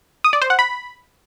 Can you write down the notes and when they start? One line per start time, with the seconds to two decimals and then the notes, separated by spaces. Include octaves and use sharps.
0.24 D#6
0.33 D5
0.42 C5
0.50 F#5
0.59 B5